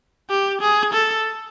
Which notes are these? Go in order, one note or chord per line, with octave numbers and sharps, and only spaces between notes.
G4
G#4
A4